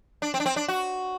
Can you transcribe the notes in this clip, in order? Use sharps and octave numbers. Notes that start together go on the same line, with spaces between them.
D4
C4
D4
C4
D4
F#4